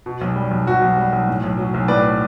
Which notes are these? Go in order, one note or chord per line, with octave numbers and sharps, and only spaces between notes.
B2
B1
G3
B1
B2 F#4
B1
G3
B1
A2
B1
F#3
B1
A2 B4 D5